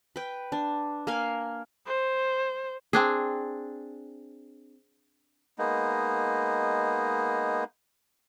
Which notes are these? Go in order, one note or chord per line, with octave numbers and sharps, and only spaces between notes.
B4 G5
D4
A#3 A#4 F5 G#5
C5
C4 D4 G#4
G#3 A#3 B3 D#4